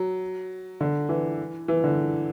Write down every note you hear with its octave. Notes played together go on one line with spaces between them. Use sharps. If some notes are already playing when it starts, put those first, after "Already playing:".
Already playing: F#3
D3
E3
E3
D3